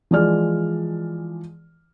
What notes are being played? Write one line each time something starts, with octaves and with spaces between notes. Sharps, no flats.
E3 F3 G#3 D5 F6